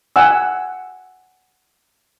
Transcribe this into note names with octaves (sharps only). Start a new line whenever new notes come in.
F#5 G#5 E6